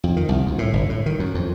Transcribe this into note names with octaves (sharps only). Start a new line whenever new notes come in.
F2
D#3
C2
D2
A2
G1
A2
D#3
F#2
F2